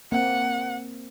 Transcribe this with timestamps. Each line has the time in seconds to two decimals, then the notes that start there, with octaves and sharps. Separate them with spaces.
0.12 A#3 C4 F#5